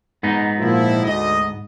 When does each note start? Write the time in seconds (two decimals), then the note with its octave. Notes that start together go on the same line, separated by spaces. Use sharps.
0.23 G#2 B3 D#4
0.58 A#2 F3 E4
1.03 D2 D#5